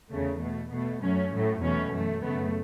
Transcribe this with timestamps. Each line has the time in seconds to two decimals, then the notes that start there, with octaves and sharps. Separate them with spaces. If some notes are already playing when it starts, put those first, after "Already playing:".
0.11 E2 C#3 A3
0.42 B2 A3
0.71 B2 A3 B3
1.01 F#2 F#3 A3 C#4
1.32 A2 F#3 A3
1.61 E2 B2 F#3 A3 C#4
1.92 F#2 E3 A3
2.22 F#2 C#3 A3 B3